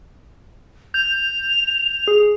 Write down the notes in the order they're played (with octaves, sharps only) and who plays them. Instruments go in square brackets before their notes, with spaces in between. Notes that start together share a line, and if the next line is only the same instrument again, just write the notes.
[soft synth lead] G6 [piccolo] F7
[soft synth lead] G#4